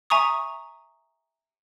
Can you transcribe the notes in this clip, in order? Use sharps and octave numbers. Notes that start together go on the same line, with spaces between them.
E5 G#5 A#5 C#6 D#6